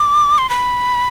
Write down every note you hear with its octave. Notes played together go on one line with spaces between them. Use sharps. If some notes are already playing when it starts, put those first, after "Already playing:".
Already playing: D6
C6
B5